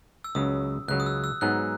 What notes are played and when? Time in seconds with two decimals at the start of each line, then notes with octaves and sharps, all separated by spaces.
0.24 E6
0.35 C#2 C#3 F#3 D#6
0.88 C#2 C#3 F#3 F#6
1.00 D#6
1.06 E6
1.24 E6
1.41 G#2 F#3 B3 D#4 G#4 F#6